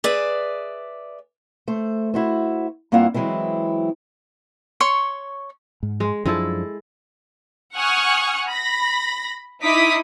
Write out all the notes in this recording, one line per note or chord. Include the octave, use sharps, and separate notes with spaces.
G#4 B4 D5 E5
A3 C5
E4 F#4 C5
G2 A#3 C4 E4 F4 F#5
E3 F#3 G#3 C4 E4
C#5 C6 C#6
G#2
G#3
F#2 F3 G#3 D4 E4 A4
F#5 G#5 C#6 D#6 F6 F#6
B5 A#6
D#4 E4 D6 D#6 B6